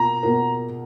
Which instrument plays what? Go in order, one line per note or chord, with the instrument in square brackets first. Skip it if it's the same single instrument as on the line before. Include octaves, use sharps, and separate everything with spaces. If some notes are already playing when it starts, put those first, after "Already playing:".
Already playing: [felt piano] B2 A#3 F4 A#4 [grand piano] A#5
[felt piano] B2 A#3 F4 A#4